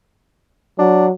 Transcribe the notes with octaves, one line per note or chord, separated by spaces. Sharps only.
F#3 D4